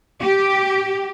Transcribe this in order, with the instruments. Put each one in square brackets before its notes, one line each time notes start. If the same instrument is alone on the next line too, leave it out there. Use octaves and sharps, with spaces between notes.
[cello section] G4